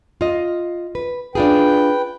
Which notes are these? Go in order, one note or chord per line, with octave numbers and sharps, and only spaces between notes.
F4 D#5
B4
D4 F4 G#4 B4 G5